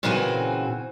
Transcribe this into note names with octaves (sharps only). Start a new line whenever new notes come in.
A#2 C#3 E3 C4 F#4 G#5